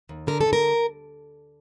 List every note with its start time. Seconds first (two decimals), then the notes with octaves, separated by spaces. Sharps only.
0.09 D#2
0.27 D3 A#4
0.41 A4
0.46 D3
0.53 A#4